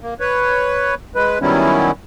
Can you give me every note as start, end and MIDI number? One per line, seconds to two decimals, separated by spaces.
0.01 0.14 58
0.20 0.95 71
0.20 0.95 73
1.15 1.39 56
1.15 1.39 71
1.42 1.91 51
1.42 1.91 54
1.42 1.91 55
1.42 1.91 59
1.42 1.91 61
1.42 1.91 64